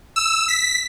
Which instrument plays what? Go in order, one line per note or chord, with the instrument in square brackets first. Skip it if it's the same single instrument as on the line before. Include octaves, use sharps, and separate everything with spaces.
[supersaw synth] E6
B6